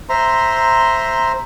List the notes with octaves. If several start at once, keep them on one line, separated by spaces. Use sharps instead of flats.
C5 E5 A#5 C6